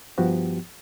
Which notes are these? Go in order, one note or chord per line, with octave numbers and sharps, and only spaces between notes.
G2 F3 B3 F#4 G4